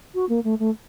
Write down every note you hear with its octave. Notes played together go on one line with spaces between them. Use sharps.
F#4
A#3
A3
A3